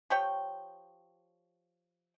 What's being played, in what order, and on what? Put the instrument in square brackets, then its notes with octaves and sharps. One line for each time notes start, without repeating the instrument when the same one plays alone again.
[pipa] F3 G4 C#5 G5